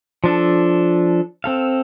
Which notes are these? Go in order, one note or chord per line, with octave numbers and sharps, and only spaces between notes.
F3 D4 A4
C4 A4 F5